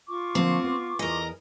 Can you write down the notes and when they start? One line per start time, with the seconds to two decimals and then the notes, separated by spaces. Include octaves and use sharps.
0.08 F4 C#6 D6
0.35 D3 F3 A#3 C4
0.64 B3
0.99 E2 E4 A#4 D#5 G#5